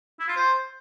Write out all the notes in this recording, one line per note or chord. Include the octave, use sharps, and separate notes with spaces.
E4
F4
C5